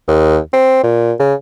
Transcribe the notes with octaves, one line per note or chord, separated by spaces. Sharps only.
D#2
C4
A#2
C#3